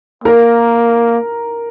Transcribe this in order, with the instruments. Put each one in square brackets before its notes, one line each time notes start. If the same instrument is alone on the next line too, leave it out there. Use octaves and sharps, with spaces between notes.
[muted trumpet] A#3 [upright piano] A#4